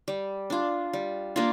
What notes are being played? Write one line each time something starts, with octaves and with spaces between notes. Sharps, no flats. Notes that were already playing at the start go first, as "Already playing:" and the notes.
G3
D4 F4
G3
A#3 D4 F4